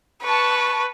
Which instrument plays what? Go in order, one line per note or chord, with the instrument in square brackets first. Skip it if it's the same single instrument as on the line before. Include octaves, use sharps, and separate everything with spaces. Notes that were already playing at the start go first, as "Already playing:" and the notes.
[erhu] B4 [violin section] A5 C#6